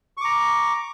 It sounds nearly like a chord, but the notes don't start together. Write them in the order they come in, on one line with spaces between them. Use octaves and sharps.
C#6 D6 A#5